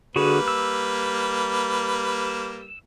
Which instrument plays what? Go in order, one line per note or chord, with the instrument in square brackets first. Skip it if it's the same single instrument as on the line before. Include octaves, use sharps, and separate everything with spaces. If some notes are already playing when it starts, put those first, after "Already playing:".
[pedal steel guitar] D3 F#4 G#4 [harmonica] G3 A#3 B4
[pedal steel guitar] E6